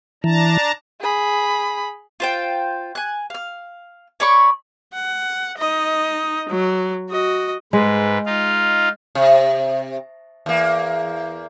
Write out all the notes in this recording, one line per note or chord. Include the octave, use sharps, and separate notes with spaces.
E3 D4 A5 A#5
G#4 B5
F4 C5 G5
G#5 F#6
F5 F6
C#5 D5 B5 C#6
F#5
D#4 D#5
F#3
F#4 D#5
G#2 G#3 B4
D#4 F4 F5
C3
E2 A#3